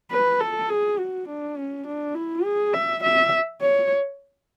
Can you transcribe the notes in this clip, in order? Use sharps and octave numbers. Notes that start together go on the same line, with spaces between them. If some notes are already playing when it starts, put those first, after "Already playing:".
B4
A4
G#4
F#4
D4
C#4
D4
E4
G#4
E5
E5
C#5